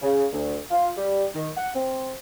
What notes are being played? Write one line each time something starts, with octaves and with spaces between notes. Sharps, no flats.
C#3
D2
F4
G3
D#3
F#5
C4